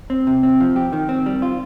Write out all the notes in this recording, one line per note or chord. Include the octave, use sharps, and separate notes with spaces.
C4
C3
C4
F3
G4
D#3
C4
G3
F4